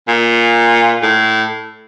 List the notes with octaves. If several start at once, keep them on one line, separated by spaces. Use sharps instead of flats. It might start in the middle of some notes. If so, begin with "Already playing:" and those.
A#2
A2